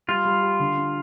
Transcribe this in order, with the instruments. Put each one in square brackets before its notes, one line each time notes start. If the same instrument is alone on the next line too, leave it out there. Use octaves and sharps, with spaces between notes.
[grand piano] G3 [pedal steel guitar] F4
[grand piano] G3
G4
D3
D4